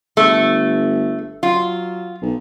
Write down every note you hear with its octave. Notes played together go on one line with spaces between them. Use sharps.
G1 A3
F#3 F4
B1